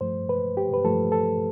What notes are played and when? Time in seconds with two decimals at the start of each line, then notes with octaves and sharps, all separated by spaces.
0.01 G2 F3 A3 C5
0.29 B4
0.57 G4
0.73 B4
0.84 G2 F3 A3 A4
1.12 A4